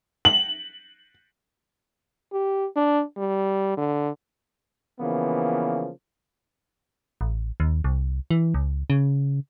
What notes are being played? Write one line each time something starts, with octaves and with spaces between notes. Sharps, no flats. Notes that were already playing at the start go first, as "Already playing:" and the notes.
F#7
G4
D4
G3
D3
C#3 E3 F3 A#3 B3
A1
D#2
C2
E3
C#2
C#3